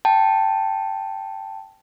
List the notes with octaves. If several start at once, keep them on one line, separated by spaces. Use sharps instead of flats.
G5 A5